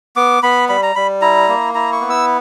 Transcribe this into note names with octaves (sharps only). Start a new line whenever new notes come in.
B3 D6
B3 B5
G3 B5
A#5
G3 B5
E4 A#5
A#3
E4 A#5
C#6
B3
E6